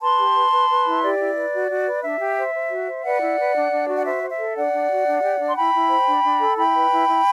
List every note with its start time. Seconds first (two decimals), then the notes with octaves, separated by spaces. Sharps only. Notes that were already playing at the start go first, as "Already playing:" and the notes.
0.01 B4 A5 C6
0.18 G4
0.35 B4
0.52 B4
0.69 B4
0.86 E4
1.02 G4 D5
1.20 E4
1.36 B4
1.53 F#4
1.70 F#4
1.87 B4
2.03 D4 E5
2.20 G4
2.37 C5
2.54 C5
2.71 F#4
2.87 C5
3.04 B4 D5 F#5
3.21 E4
3.39 B4
3.55 D4
3.72 D4
3.88 F#4
3.96 F#5
4.06 C5 E5
4.22 C5
4.30 E5
4.39 A4
4.55 D4 D5 F#5
4.73 D4
4.89 F#4
5.07 D4
5.24 G4
5.40 D4
5.48 C6
5.56 E4 G5 B5
5.74 E4
5.90 C5
6.07 D4
6.24 D4
6.40 A4
6.58 E4 G5 B5
6.75 B4
6.92 E4
7.08 E4